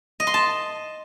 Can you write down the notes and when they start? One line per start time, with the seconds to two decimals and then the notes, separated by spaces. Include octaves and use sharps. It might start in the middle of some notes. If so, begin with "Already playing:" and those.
0.20 D#5
0.27 C6
0.34 A5